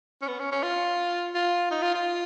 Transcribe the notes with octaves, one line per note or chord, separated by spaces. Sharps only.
C#4
B3
C#4
C#4
F4
F4
D#4
F4
F4